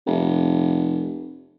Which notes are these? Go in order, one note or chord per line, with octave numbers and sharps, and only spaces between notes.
F1